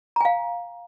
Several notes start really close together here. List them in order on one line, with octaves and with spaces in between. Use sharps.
A#5 G#5 F5